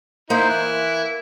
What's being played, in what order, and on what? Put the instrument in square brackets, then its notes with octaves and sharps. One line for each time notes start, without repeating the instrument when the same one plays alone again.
[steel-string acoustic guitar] A#3 [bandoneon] D#4 C5 [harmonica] E4
[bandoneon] E3 F#6